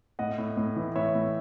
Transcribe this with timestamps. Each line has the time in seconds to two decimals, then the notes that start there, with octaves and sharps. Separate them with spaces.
0.19 A2 D#5 F#5
0.38 A2
0.57 A2
0.76 E3
0.96 A2 C#5 E5
1.15 A2